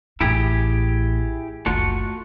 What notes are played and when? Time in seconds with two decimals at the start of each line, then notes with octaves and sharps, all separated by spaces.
0.20 A1 A2 E4 G4 G#4
1.66 F#1 C#2 A3 F4 F#4